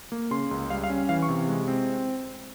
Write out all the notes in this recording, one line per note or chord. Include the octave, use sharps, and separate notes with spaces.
A#3
C#3 C6
C#2
G3 F5
F5
C#4
E3 F5
C#6
C3
G#3
C4